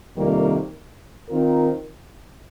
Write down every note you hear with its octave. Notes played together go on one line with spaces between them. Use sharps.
F2 C3 D#3 G3 A#3
D#3 C4 F4 A#4